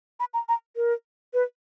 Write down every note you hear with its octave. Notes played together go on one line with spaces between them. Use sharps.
B5
A#5
A#5
A#4
B4